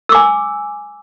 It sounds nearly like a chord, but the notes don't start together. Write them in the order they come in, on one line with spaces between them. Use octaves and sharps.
E6 D6 G#5